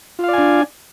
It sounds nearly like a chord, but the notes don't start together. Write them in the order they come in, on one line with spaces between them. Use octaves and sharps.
F4 F5 D5 G#5 D4